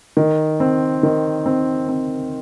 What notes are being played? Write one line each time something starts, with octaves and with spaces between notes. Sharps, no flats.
D#3
C4
D#3
C4
C4